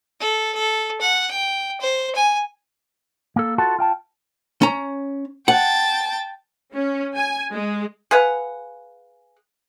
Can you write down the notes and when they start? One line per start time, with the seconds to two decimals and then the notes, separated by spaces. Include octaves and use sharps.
0.21 A4
0.55 A4
1.01 F#5
1.31 G5
1.81 C5
2.15 G#5
3.36 A#3 A4
3.58 F4 F#4 A4 F#5 A5
3.79 F4 G5 A5
4.62 C#4 A#5
5.48 F#5 G5 A5
6.74 C#4
7.16 G#5
7.53 G#3
8.11 G#4 B4 F5 F#5